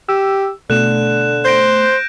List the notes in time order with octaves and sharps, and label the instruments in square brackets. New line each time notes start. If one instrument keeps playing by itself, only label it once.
[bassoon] G4 [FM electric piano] E6
[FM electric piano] B2 A3 [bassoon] D3 [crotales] F#6 E7
[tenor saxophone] C5 [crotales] G6 A#6 D7